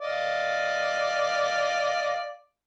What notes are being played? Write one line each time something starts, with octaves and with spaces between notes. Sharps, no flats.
D5 D#5 F5